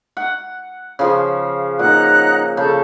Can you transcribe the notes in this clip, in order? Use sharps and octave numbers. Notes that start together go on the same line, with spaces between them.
F#5
C#3 F3
A#2 D#4 F#5 F#6
C#3 A4 A5 G6